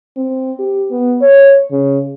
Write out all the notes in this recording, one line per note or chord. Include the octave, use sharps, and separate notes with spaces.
C4
G4
B3
C#5
C#3